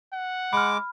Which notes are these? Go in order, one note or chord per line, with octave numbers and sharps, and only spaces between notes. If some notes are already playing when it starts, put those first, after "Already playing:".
F#5
G#3 B5 D6 F6